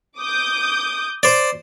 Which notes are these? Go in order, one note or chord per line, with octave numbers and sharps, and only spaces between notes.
D6 D#6 G6
C5 D5